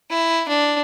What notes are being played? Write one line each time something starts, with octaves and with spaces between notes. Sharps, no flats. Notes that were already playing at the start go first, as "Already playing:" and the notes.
E4
D4